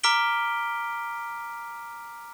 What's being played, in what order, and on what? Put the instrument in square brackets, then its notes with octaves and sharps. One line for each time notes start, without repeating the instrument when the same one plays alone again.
[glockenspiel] A#5 D6 F6 B6 D7 G7